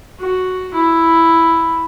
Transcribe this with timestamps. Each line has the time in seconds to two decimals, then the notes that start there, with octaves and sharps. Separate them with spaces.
0.20 F#4
0.74 E4